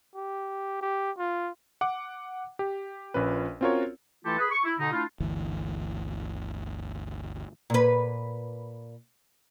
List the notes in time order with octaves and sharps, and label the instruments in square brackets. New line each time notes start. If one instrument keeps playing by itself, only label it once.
[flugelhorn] G4
G4
F4
[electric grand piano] F#5 D6
G4
A#1 A#2 C#4 B4
C4 C#4 F4 F#4 A#4 C#5
[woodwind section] E3 A3 E4 F4 G4 A4
G#4 B4
C#6
E4
B2 D3 D#4
A3 D4 E4 F4
[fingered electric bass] G1 D2 E3
[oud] A#2 B4